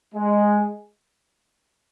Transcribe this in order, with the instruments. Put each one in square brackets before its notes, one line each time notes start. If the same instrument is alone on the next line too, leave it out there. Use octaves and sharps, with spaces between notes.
[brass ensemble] G#3